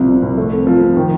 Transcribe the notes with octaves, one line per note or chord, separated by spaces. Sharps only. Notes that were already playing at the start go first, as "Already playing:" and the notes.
Already playing: C2 F3
C3
C2
A3
C4
F3
C3
D#3